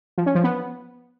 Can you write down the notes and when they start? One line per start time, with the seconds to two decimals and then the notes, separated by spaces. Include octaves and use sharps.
0.18 F3
0.26 C#4
0.35 F3
0.44 B3